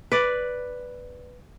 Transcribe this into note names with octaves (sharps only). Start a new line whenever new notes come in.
B4 D5